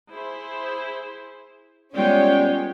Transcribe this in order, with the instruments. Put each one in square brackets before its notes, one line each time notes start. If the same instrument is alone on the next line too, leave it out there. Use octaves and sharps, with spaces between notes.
[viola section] E4 G#4 C5
[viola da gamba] G3 B3 F4 [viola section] G#3 C#5 G5 [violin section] C#4 [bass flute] D5